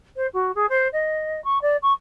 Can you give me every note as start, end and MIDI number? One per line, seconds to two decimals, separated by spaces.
0.16 0.26 72
0.33 0.51 66
0.55 0.66 68
0.69 0.88 72
0.92 1.42 75
1.44 1.58 85
1.61 1.76 74
1.82 1.93 85